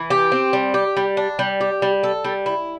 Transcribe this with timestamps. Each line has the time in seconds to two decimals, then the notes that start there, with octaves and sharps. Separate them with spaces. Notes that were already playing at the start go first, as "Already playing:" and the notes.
Already playing: E3
0.10 G4
0.32 C4
0.53 G3
0.74 G4
0.97 G3
1.17 D4
1.39 G3
1.61 G4
1.82 G3
2.03 A4
2.24 G3
2.46 E4